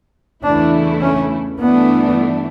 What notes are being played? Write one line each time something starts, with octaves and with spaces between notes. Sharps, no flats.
E2 C#3 E3 A3 D4 E4
C#4
G2 E3 A3 B3 D4